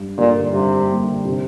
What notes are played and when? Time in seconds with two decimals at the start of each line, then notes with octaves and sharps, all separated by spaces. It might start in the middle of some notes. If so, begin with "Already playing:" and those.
Already playing: G2
0.17 A#2 D3 G3 A#3
0.53 G2 C3
0.89 D3 G3 A#3
1.25 C3